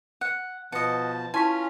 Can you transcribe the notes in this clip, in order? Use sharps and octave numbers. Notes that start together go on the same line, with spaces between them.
F#5 F#6
B2 F3 B4 D#5 F#5 A5
C#4 E4 F4 G#5 A5 C6 C#6 B6